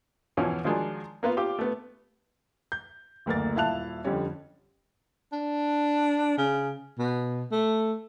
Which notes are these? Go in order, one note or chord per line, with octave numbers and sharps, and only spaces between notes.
E2 B2 E3 F3 C#4
D#3 F3 F#3 G#3 D4
A#3 B3 F4
F4 G4 D6
A3 B3
G6
F#1 D2 A#3 A#4 A6
D#1 E4 F5 A5 F#6 F7
F2 D3 G3 C#4
D4
C#3
B2
A3